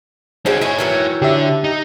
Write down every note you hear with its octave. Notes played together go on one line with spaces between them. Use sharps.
C4 C#4 D#4 F#4 G#4
E4 G#4 C#5 D#5
D#3 E3 F#3
D3 G4 E5
D#4